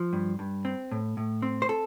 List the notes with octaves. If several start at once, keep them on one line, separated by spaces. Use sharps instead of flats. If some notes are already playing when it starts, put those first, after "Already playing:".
Already playing: F3
G2
G2
C4
A2
A2
C4
C5
A4